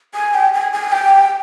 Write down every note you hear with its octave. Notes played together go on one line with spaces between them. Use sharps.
G#5
G5
G#5
G#5
G5